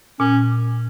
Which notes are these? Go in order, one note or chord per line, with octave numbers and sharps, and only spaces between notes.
A#2 C#4